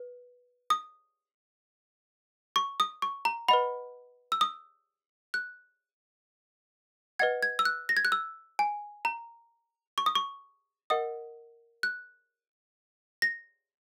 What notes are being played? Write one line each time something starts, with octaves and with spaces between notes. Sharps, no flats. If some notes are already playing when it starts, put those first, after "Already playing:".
Already playing: B4
D#6
C#6
D#6
C#6
A#5
B4 D#5 F#5 B5
E6
D#6
F#6
B4 D#5 F#5 G#6
G#6
E6
F#6
A#6
G#6
F#6
E6
G#5
A#5
C#6
D#6
C#6
A#4 D#5 F#5 D#6
F#6
A#6